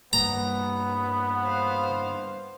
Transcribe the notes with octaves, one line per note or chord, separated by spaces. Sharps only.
G2 A#3 B3 A#5
C5 F5